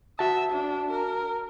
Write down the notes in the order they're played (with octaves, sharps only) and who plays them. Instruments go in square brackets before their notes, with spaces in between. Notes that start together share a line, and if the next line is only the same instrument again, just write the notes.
[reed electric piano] F#4 A5 [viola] E5
[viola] D4
A#4